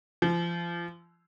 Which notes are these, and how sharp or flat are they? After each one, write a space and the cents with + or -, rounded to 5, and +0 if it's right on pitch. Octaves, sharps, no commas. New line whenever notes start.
F3 -35